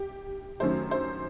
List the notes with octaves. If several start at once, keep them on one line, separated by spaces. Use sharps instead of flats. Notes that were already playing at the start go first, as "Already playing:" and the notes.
Already playing: G4
F#2 D#3 F#3 A3 C#4 C5
C5